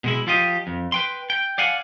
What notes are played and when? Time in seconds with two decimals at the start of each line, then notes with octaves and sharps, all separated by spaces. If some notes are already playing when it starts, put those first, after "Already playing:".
0.04 B2 G#3 E4
0.27 F3 F4 G4 D#5
0.67 F2
0.92 B4 G5 C6
1.30 G5
1.58 D5 F5 F#5 G#5